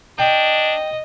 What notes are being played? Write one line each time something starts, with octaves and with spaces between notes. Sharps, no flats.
D4 D#5 G5